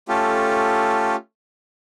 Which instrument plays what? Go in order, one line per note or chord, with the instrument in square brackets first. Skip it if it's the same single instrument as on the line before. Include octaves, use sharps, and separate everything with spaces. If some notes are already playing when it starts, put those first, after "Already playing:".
[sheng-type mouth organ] A3 C#4 F4 G4 A4